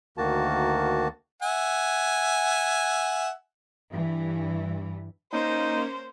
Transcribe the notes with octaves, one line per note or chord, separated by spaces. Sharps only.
D2 D#3 A#3 F#4 A5
E5 F#5 G#5
G2 E3
A#3 C#4 D#4 C5